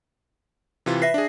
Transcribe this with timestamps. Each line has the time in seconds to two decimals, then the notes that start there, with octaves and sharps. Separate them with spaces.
0.86 C3 E3 F4
1.02 B4 E5 A#6 C7
1.14 D4 G#4